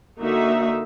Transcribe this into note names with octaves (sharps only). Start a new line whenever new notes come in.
D3 A#3 D#4 F#4 E5